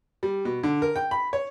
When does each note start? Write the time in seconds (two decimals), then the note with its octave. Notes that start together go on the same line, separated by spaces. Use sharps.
0.23 G3
0.45 B2
0.63 D3
0.82 A#4
0.96 G5
1.11 B5
1.33 C#5